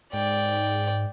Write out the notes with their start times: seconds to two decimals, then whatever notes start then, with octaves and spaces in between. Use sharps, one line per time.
0.13 G#2 D5 G5